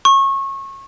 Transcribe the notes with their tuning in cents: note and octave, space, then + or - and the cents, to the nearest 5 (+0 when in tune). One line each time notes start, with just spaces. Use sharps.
C#6 -25